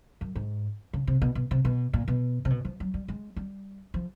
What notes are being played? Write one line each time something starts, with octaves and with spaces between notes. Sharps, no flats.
F#2
G#2
C#3
C3
B2
B2
C3
B2
A#2
B2
C3
B2
F3
F#3
G3
G#3
G3
F3